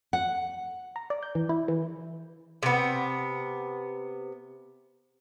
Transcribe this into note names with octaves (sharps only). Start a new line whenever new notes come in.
F#5
A#5
D5
G6
E3
E4
E3
C3 B3